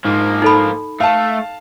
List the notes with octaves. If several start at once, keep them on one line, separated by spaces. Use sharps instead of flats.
G#2 F3 A#3
D#4 A4 B5
A3 F5 A5